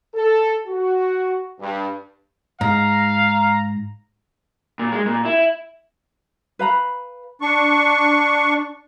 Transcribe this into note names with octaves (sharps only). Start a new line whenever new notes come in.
A4
F#4
G2
G#2 F5 A#5
A#2
G#3
A#2
E4
B4 F5 A#5 B5
D4 C#6